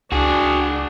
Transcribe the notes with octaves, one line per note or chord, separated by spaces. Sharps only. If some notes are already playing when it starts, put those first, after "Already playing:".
C#2 D4 F#4 G#4